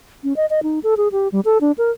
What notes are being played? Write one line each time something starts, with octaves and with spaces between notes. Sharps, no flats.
C#4
D#5
D#5
D#4
A4
G#4
G4
G3
A4
D4
A#4